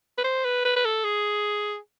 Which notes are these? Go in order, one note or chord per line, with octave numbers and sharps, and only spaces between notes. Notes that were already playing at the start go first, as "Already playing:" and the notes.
B4
C5
B4
B4
B4
A4
G#4